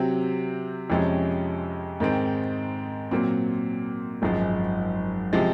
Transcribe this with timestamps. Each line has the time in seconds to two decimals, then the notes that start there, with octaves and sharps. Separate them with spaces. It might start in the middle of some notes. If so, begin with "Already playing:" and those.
Already playing: C3 F#3 C4
0.90 F2 C3 F3 G#3 C#4
2.00 G#2 D#3 G#3 C4
3.11 A#2 F#3 C4
4.22 G#1 F#2 F3 G#3
5.33 C3 F3 G#3